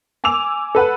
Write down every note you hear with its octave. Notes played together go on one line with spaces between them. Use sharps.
G#5 D6 E6 F7
A4 B4 F#5 F#6